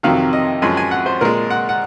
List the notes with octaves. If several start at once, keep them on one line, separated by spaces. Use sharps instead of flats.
F2 C3 D#3 F#3 F5
D#5
F#2 F3 G#3 G#5
G#5
F#5
C5
A#2 G#3 A#4
F#5
F#5